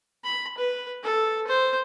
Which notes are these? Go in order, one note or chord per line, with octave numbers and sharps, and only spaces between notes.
B5
B4
A4
C5